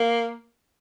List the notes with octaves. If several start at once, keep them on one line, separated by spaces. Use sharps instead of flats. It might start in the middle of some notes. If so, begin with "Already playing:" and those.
Already playing: A#3